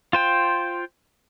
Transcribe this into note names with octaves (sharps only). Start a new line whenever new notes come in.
F4 C5 G5